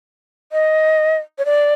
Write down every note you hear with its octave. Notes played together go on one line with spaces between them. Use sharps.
D#5
C#5
D5